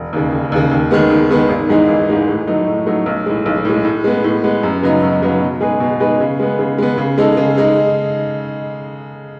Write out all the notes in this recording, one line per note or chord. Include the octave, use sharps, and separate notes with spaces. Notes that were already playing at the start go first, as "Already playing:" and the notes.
Already playing: E1
D#2 C#3
E1
D#2 C#3
D#2
D#3 G#3 B3
D#2
D#3 G#3 B3
G#1
G#2 E3 G#3 D#4
G#1
G#2 E3 G#3 D#4
A2
F#3 A3 D#4
A2
F#3 A3 D#4
B1
A2 G#3
B1
A2 G#3
A2
G#3 B3
A2
G#3 B3
F#2
C#3 F#3 B3 D#4
F#2
C#3 F#3 B3 D#4
B2
G#3 D#4 G#4 B4
B2
G#3 D#4 G#4 B4
C#3
G#3 B3
C#3
G#3 B3
C#3
G#3 D#4 A4
C#3
G#3 D#4